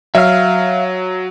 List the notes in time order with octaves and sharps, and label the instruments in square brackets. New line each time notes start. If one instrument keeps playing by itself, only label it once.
[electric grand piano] F#3 [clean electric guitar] E5 F5